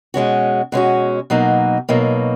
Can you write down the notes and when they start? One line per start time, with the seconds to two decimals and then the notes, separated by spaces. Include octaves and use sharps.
0.14 B2 G#3 C#4 F#4
0.72 B2 G#3 C#4 F#4
1.30 B2 F#3 A#3 D#4
1.89 B2 F#3 A#3 D#4